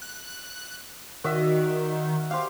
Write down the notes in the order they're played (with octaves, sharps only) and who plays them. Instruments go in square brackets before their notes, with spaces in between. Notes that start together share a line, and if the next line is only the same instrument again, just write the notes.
[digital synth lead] F#6
[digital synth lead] D#3 [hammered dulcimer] F#4 D5 E5
[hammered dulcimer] G4 C5 [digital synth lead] F5